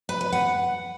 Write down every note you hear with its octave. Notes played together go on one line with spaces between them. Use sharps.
B4
B4
F#5